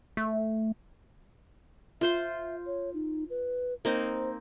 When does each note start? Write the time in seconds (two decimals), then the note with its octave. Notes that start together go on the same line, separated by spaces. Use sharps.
0.17 A3
2.01 F4 C5 E5 C6
2.66 C#5
2.94 D#4
3.30 B4
3.85 A#3 C4 D#4 C5